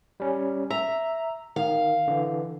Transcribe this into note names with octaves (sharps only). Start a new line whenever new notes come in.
G3 C#4
E5 A#5
D#3 F5
D3 E3